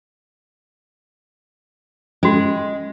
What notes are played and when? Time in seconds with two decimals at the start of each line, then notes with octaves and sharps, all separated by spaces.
2.23 G#3 C#4 F#4